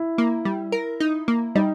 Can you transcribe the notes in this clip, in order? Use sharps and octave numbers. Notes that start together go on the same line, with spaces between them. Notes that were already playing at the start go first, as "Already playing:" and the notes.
Already playing: E4
A#3
G3
A#4
D#4
A#3
G3 D#4